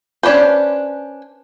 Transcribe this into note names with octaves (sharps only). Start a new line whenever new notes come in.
C#4 D4 B4 C5